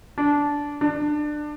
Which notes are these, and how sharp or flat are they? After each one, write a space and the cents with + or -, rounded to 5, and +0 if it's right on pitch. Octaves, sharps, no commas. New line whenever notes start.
D4 -15
D4 +20